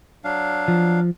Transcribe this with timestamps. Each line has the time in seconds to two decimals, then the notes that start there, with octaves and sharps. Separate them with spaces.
0.24 F#3 D4 F5
0.68 F3